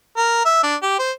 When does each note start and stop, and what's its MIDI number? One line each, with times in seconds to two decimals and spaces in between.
0.17 0.42 70
0.45 0.60 76
0.63 0.75 62
0.82 0.98 67
0.99 1.12 72